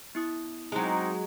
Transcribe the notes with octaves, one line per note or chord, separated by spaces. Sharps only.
B3 E4 D#6
F#3 G#3 C4 D#4